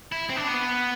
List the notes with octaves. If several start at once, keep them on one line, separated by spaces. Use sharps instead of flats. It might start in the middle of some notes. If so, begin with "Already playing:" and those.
E4
C4
D4
B3